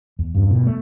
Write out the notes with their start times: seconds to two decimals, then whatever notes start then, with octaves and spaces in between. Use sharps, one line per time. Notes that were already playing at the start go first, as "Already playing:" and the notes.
0.19 E2
0.35 G2
0.51 B2
0.66 A3